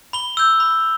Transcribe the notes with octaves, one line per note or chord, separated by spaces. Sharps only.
B5 G7
E6 G6
B5